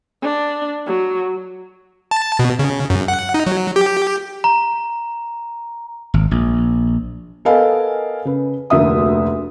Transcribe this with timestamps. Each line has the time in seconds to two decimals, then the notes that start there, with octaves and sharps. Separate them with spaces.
0.22 D4
0.86 F#3
2.11 A5
2.39 B2
2.59 C#3
2.90 F#2
3.08 F#5
3.34 D#4
3.47 F#3
3.76 G4
4.44 A#5
6.14 G#1
6.31 A#1
7.45 B3 A4 A#4 D#5 F5 G#5
8.25 C#3 B4
8.70 F1 D2 A#3 E5 D#6